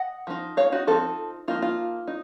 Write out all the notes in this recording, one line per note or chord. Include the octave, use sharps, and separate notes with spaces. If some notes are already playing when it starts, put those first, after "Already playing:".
Already playing: D#5 F#5
F3 A3 D#4
C#5 F5
D#4 F#4
F3 C4 D#4 F4 A4
F3 A#3 D#4 F4
F4
D#4